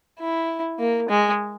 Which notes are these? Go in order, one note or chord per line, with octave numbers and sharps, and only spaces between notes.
E4
A#3
G#3